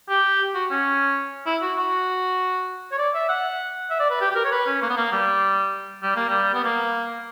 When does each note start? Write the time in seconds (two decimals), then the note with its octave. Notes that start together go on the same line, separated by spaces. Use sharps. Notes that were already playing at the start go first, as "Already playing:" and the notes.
0.09 G4
0.54 F#4
0.71 C#4
1.46 E4
1.62 F#4
1.77 F#4
2.92 C#5
2.98 D5
3.14 E5
3.29 F#5
3.90 E5
3.99 D5
4.10 B4
4.21 G4
4.31 G4
4.35 A#4
4.45 C#5
4.51 B4
4.66 C#4
4.82 A#3
4.90 B3
4.97 A#3
5.12 G3
6.03 G3
6.16 A#3
6.29 G3
6.54 B3
6.64 A#3